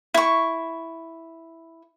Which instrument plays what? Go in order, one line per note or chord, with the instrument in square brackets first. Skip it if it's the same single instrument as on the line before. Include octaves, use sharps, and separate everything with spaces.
[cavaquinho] E4 C#6